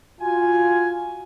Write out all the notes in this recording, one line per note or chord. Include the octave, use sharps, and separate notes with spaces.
F4 F#4 G#5